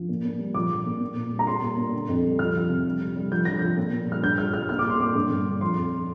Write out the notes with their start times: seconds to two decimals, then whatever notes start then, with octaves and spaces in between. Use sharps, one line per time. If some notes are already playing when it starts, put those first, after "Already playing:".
Already playing: F3
0.09 A#2
0.25 A#2
0.39 G3
0.54 F3 D6
0.70 F3
0.86 A#2
1.01 A#2
1.16 A#2
1.32 G3
1.39 A#5
1.47 G3 C6
1.62 A#2
1.77 A#2
1.93 D3
2.09 F2
2.23 G3
2.39 F3 F6
2.55 F3
2.69 C3
2.85 G3
3.01 G3
3.15 G3
3.31 F3 G6
3.45 F3 A#6
3.59 F3 G6
3.77 A#2
3.93 A#2
4.08 G3 F6
4.23 G2 G6
4.38 G3 F6
4.53 G3 F6
4.69 A#2 F6
4.79 D6
4.84 A#2 C6
5.00 A#2 D6
5.15 G2
5.30 G2
5.46 D3
5.61 F3 C6
5.77 F2